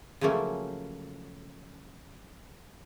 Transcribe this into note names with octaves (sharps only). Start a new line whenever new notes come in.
C#3 F3 F#3 A3 A#3 C#4